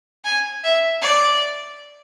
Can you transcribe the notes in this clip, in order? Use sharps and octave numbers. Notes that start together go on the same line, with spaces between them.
G#5
E5
D5